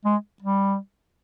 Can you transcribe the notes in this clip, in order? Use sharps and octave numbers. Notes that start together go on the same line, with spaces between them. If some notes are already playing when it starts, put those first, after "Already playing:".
G#3
G3